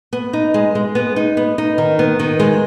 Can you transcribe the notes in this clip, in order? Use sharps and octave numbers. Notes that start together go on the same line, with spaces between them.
B3
D#4
G#3
G#3
B3
D#4
B3
D#4
D#3
B3
D#3
G#3